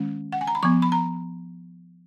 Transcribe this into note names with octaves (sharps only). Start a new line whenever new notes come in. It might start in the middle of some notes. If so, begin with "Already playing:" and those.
Already playing: D#3 G#3 C#4
F#5
G#5
A#5
B5
F3 B3 C#6
B5
A#5